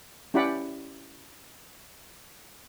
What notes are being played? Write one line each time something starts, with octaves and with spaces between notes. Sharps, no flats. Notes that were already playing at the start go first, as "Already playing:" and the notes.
C#4 E4 G4 D5 F#5 B5